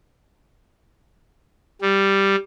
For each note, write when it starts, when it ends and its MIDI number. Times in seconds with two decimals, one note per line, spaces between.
1.81 2.35 55